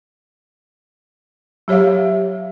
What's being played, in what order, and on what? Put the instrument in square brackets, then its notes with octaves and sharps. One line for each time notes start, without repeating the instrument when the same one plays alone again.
[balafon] F#3 G4 C#5 E5 F5